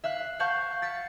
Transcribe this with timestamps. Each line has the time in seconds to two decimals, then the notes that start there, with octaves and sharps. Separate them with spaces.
0.04 E5 F5 F#6
0.39 F5 F#5 A5 C#6 G6
0.82 A6 B6 C#7